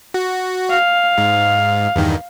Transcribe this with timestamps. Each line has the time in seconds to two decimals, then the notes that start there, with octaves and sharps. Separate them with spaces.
0.14 F#4
0.70 F5
1.18 G#2
1.96 E2 G2 D#3